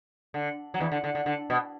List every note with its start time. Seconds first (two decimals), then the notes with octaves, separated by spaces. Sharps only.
0.34 D3
0.74 F#3
0.81 E2 E3
0.92 D3
1.04 D3
1.15 D3
1.26 D3
1.50 B2